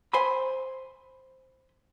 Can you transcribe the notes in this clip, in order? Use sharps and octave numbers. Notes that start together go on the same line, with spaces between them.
C5 G#5 B5